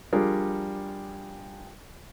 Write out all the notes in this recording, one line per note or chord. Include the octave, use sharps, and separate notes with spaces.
F3 G3 D4 F4 G#4 A#4